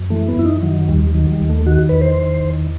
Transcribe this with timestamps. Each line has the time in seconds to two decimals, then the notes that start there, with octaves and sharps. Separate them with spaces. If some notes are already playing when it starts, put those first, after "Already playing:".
Already playing: F#2
0.10 E3 A3
0.28 B3
0.37 F#2 E4
0.45 D#4
0.62 D#3 F#3
0.88 D#2 G3
1.14 D#3 F#3
1.32 G3
1.41 D#2
1.49 A3
1.66 D#3 F#4
1.89 E2 B4
2.01 C5
2.19 D#3
2.44 E2